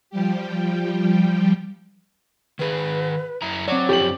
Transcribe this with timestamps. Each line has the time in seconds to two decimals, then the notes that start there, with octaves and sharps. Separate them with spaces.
0.10 F3 G3 G4
2.59 D#3 G#4 B4
3.42 F#2 E4 A#5
3.68 F#3 C4 F#4 C#5 D5
3.89 F#2 D3 F3 G4 F#7